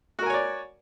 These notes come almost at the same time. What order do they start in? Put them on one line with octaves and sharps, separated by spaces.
F#4 A#4 G#5 C#5 D5